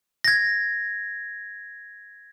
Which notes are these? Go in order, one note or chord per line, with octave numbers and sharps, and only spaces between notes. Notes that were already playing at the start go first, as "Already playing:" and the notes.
G#6 A#6